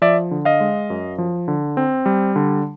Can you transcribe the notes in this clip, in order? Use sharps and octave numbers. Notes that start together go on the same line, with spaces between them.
F3 D5 E5
D3
D#5 F5
G#3
F#2
F3
D3
C4
G3
D3